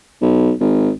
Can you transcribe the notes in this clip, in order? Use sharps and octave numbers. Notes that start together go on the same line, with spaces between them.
B1
G#1